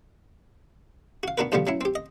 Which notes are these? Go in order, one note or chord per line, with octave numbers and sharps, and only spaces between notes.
F#4 F5
B3 D4 F#4 A#4 B4
B1 G#2 D3 F3 G3 B3
F#3 C#4 E4
C4 G4
D#5